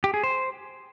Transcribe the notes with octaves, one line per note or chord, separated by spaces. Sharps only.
G4
G#4
C5